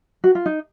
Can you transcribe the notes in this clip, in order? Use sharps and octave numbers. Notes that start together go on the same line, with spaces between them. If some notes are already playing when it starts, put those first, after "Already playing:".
F#4
F4
D#4